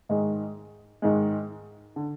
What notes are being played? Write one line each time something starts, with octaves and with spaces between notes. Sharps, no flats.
G#2 D#3 G#3
G#2 D#3 G#3
D3